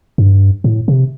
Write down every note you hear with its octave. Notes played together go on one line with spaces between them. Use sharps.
G2
A2
C3